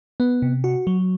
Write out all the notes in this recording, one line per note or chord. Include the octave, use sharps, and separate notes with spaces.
B3
C3
F#4
F#3